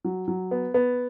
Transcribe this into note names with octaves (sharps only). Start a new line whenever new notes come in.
F#3
F#3
B3
B3